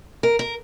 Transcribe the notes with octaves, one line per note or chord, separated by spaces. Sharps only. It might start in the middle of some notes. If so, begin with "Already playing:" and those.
A#4
A#4